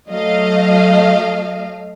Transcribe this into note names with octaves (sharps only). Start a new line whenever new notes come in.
F#3 A3 D#5 F5